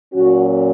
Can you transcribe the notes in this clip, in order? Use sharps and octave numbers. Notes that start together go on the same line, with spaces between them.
A#2 F#3 C#4 F#4